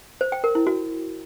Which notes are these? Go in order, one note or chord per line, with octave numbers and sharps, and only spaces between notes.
C5
G5
A#4
E4
F#4